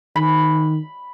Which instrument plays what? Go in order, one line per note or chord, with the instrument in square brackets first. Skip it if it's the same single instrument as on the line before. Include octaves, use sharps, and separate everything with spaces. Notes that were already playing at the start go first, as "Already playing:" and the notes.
[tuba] D#3 [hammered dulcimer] B5